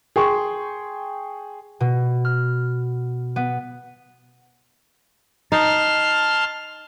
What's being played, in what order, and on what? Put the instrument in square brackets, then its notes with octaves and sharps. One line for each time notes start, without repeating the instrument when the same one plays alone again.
[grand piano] G#4 G5 C6 C#6
[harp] B2
F6
B3
[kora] D#4 [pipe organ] A5 C6 F6